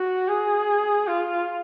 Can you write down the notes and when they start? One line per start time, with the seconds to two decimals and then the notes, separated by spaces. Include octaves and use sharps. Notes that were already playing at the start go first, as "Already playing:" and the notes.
Already playing: F#4
0.28 G#4
1.07 F4